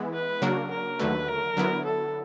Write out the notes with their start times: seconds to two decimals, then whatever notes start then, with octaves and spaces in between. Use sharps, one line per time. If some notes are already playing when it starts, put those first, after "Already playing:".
Already playing: E3 G#3 B3 E4
0.13 B4
0.42 C#3 F#3 A#3 D4 F#4 A#4
0.70 A#4
0.99 D#2 D3 F#3 A3 B4
1.28 A#4
1.57 D3 F#3 B3 E4
1.85 A4